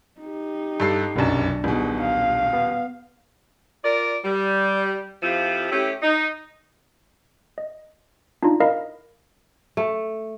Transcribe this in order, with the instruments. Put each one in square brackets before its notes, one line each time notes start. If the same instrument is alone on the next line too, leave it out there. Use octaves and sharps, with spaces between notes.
[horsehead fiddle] D#4 G4
[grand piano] G2 A4 C7
[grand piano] F1 F#2 [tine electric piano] B1 D4 A5
[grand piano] D#1 B2 [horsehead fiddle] D#4 G#4
[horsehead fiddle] F5
[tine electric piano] B3
[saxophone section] F4 A#4 D5
G3
F2 F3 E4 F4 G4
A3 C#4 E4 G4
D#4
[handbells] D#5
D4 D#4 F4
E4 A#4 D#5 F5
[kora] A3